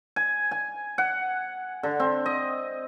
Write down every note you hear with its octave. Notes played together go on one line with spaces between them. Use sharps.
G#5
G#5
F#5
D3
C4
D#5